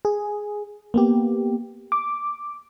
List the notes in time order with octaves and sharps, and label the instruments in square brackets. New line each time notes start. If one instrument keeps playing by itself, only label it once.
[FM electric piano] G#4
A#3 B3 G4
D6